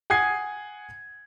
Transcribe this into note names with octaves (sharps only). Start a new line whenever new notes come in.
F#5 G#5 D#6 G#6 C7